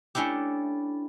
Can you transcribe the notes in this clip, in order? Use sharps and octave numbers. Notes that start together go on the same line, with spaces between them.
A3 C#4 D4 E4 G4